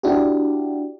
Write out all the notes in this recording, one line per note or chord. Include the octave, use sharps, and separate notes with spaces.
D4 E4 F#4 G4